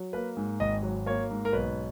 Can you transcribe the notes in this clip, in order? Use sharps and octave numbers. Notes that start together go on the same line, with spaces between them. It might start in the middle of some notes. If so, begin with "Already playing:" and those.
Already playing: F#3
A#3 B4
G#2
G#1 D#5
F#3
A#3 C#5
G#2
A#4
B1 B4